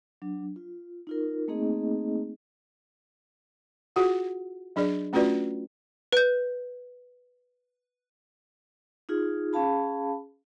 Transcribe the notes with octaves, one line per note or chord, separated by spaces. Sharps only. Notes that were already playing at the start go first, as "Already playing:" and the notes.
F#3 D4
F4
D#4 F4 A#4
A3 A#3 C4 D#4 G#4 D#5
F4 F#4 G#4 F#5
F#3 D4 G#4 D5
A3 C#4 F4 F#4 B4 D5
B4 G6
D#4 F4 G#4
C#4 G#4 F5 A5 B5